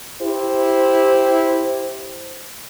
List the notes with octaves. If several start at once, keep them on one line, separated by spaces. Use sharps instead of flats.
E4 G4 C5